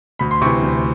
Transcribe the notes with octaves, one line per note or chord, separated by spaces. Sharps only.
D2 B5
C6
C3 E3 C#6
D2